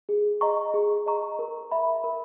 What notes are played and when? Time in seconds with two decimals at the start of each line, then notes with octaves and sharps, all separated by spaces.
0.09 G#4
0.41 D#5 A#5 C#6
0.74 G#4
1.06 D#5 A#5 C#6
1.39 A#4
1.71 E5 B5
2.04 A#4